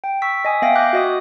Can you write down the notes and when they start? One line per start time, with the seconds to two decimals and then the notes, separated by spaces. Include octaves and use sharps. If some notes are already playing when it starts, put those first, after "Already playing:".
0.04 G5
0.22 C#6 E6 B6
0.45 D#5 G#5 D#6
0.62 B3 E5 F5 G5 A#6
0.76 D6 F#6 G6
0.93 F#4 D#5 D#6